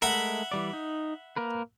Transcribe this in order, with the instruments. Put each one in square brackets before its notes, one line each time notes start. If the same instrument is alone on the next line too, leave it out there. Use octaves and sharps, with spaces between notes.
[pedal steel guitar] G#3 A3 A#4 [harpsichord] E5 F#5 B5
[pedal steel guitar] E3 G3 D5
D#4
A#3 A#4 B4